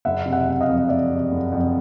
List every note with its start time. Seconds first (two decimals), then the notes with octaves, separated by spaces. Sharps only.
0.05 F#1 E5 F#5
0.26 C3
0.32 E5 F#5
0.47 F#1
0.52 F#5
0.61 D#5 F5
0.68 F2
0.88 F#1 D5 E5
1.10 C3
1.31 F#1
1.52 F2